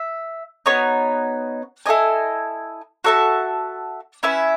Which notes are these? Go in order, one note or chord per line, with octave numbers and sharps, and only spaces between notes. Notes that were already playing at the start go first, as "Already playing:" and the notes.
Already playing: E5
B3 D#4 F#4 C#5
E4 A4 D#5 G#5
F#4 A4 E5 A5
C#4 E4 B4 E5